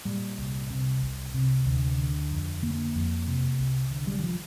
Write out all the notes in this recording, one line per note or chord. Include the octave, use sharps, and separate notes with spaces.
A#2 G3
C2
C3
C2
C3
D2
D3
F2
D3 A#3
F2
C3
C2
D3
G3
D#3
F3